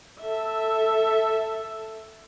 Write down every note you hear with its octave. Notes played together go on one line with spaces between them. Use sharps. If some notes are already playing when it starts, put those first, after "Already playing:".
A4 E5